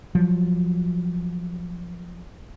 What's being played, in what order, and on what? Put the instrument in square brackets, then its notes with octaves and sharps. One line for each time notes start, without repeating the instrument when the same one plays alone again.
[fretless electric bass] F3 F#3